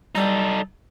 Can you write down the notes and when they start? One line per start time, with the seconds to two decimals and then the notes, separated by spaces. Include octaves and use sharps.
0.15 G3 D#4 A4